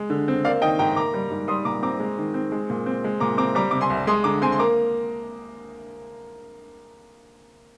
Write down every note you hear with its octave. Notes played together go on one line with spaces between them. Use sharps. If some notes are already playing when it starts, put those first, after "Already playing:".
Already playing: G#3
D3
C4
A#3 D5 F5
D#3 D#5 G5
G#2 G5 A#5
A#3 A#5 D6
G3
G#2
G3 C6 D#6
A#2 A#5 D6
C4 A#5 D6
G#3
D#3
C4
G#3
A#2
C4
G#3
A#2 A#5 D6
C4 A#5 D6
G3 A#5 D6
C3 D6
G#5 C6
C2
G#3 C6 D#6
D3 A#5 D6
C4 G#5 C6
C6
A#3 A#5 D6